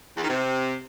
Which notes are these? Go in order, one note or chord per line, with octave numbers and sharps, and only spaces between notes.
E2
D#3
C3